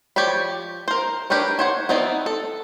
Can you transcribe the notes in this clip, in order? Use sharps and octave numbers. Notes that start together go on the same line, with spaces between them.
F3 G4 C#5 D5 B5
A#4 C5
D4 G4 A#4 B4 C#5
C5 C#5 F#5
B3 C4 D#4 E4 D5
A4